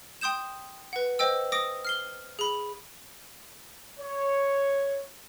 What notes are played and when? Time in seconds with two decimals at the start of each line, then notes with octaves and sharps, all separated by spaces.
0.21 G5 C6 D#6 G6 E7
0.93 B4 F#5
1.19 C5 D#5 G5 E6
1.52 D6 D#6 A#6 D7
1.85 F6 C7 G7
2.39 G#4 B5
4.00 C#5